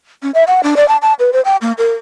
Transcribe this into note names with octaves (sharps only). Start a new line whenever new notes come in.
C#4
E5
F#5
D4
D5
A5
A5
B4
C5
G5
A#3
A#4